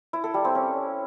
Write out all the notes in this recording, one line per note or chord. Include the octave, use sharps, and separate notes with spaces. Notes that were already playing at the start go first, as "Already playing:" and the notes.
E4
A4
G3
C4
C#4